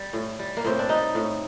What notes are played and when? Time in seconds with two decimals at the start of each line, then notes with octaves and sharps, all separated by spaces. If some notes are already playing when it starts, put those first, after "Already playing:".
Already playing: G3
0.13 A2
0.39 G3
0.57 A#3
0.65 A2 C4
0.79 D4
0.89 G3 D#4
1.15 A2